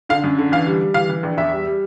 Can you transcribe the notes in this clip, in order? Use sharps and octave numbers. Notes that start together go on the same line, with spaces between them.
D3 F5
F#2
D3
E3 F5
G3
G3
E3 F5
E3
A#1
E2 E5
G3
G3